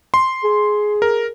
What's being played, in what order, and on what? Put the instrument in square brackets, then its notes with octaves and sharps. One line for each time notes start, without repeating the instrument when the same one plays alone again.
[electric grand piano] C6
[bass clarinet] G#4
[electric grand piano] A#4